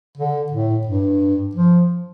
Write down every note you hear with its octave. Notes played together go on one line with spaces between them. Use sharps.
D3
A2
G2
F3